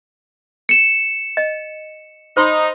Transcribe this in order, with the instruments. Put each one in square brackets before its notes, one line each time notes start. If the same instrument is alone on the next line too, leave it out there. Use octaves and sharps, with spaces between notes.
[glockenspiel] C#7 E7
[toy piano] D#5
[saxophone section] D#4 [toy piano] C5 B5 C6